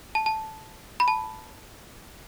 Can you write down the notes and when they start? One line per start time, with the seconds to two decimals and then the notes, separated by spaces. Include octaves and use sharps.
0.15 A5
0.26 A5
1.00 B5
1.08 A5